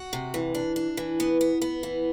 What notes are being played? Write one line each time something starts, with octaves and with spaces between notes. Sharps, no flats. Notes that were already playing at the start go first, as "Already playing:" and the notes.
Already playing: F#4
C3
E3
D4
D4
E3
B3
B3
B3
E3